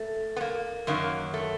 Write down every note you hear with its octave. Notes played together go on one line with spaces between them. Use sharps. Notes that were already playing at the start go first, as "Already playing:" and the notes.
Already playing: A3
B3
A#3
F#2 D#3 F#3 A#3
A3